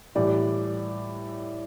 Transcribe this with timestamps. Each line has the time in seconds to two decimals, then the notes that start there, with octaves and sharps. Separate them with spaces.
0.15 A2 E3 G3 D5